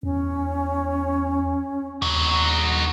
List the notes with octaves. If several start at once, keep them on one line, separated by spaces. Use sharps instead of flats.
E2 C#4
D#2 D#4 F#4